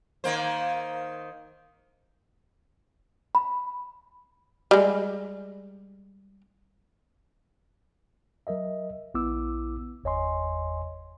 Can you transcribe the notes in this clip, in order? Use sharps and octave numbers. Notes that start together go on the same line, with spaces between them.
D#3 A#3 C5
B5
G3 G#3
F#3 A#4 D#5 E5
A#1 B3 E4 D6 E6
G1 E2 C#5 D#5 G#5 C6